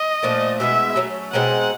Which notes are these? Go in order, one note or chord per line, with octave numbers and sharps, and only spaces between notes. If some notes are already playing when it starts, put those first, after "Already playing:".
Already playing: D#5
A#2 F3 A3 D4
B2 G#3 B3 E4 E5
F#3 A3 C#4
B2 G#3 C4 D#4 F#5